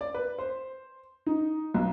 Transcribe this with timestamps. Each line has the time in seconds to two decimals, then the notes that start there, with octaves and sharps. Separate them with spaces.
0.01 D5
0.14 B4
0.39 C5
1.26 D#4
1.74 B1